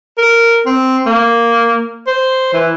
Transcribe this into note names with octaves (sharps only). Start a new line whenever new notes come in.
A#4
C4
A#3
C5
E3